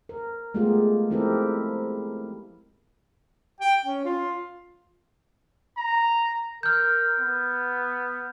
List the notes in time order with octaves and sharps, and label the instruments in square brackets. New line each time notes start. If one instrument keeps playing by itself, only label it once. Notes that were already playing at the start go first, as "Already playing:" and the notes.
[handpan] A#4
G#3 A3 B3 F4 G4 G#4
F3 C4 E4 G4 A4 A#4
[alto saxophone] G5
C#4
F4
[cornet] A#5
[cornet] A#4 [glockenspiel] F6 G6
[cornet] B3